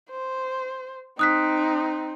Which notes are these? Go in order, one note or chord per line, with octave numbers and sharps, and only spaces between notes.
C5
C4 D#4 D#6 F#6 B6